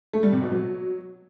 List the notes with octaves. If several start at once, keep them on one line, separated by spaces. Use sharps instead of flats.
A3
G3
C3
B2
F#3